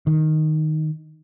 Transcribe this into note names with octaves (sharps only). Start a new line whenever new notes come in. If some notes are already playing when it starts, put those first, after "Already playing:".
D#3